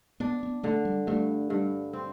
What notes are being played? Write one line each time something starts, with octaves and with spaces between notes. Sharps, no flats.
B3 D4
B3
D3 A3
G3
G2 A3
G2
C4